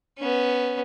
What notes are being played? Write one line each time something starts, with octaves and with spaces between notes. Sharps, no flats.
B3 C#4